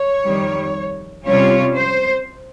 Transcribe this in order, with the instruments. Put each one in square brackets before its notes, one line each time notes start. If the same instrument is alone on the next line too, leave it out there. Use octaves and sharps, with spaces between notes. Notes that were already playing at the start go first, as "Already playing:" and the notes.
Already playing: [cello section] C#5
F2 D#3 G3
C3 G3 C#4 F4 C#5
C5